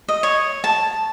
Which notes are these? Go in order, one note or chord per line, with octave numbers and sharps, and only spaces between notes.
D#5
C#5
A5